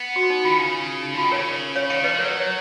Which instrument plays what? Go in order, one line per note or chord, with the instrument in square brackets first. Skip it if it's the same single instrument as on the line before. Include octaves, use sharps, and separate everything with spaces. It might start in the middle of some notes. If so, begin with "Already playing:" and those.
Already playing: [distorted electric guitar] B3
[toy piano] F#4
D#4
[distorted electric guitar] D#3 [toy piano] F4
[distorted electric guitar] C#3
[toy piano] D#4
[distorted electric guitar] F3 [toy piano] F4
[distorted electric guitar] D#3
[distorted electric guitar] C#3 [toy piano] A#4 C#5
[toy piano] C#5 F5
[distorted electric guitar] D#3 [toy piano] C#5 F5
[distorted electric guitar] F3 [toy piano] B4 D#5
[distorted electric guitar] G#3
[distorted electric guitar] F#3 [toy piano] A#4 C#5
[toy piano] C#5